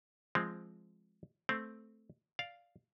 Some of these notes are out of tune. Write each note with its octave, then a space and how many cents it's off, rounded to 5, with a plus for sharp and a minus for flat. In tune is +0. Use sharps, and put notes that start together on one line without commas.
F3 -15 G#3 +0 C4 +0
A3 +0 C4 +0
D5 +0 F5 +0